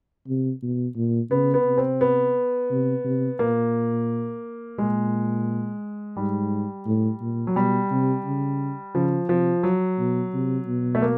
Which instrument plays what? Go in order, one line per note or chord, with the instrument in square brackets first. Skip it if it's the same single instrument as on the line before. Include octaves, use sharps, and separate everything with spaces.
[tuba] C3
B2
A#2
[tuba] C#3 [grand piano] B3
[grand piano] B3
[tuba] C3
[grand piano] C4
B3
[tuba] C3
C3
[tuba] A#2 [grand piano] A#3
[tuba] A#2 [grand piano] G#3
[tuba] G#2 [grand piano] G3
[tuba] A2
A#2
[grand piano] F#3
[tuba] B2 [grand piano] G3
[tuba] C3
C#3
[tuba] C#3 [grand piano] F3
[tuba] C3 [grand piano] F3
[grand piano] F#3
[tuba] B2
C3
B2
[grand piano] A3
A#3